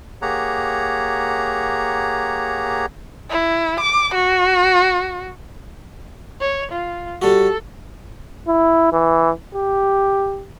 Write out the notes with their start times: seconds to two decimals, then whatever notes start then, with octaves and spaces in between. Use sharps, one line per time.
0.22 A#3 G4 G#4 C#5 F#5 A#5
3.30 E4
3.81 D6
4.15 F#4
6.41 C#5
6.72 F4
7.22 G3 F#4 A4
8.48 E4
8.93 E3
9.55 G4